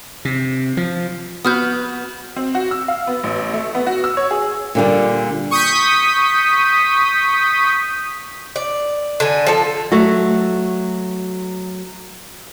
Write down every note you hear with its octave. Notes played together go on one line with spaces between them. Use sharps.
C3
F3
B3 F#4 B4 D#6 F6 G6
C4
F#4
E6
F5
B3
A1
A3
B3
F#4
E6
C#5
G#4
A#2 D3 G3
C#6 D#6 G6 B6
D5
D3 G#5
F3 A4
F#3 A3 F#4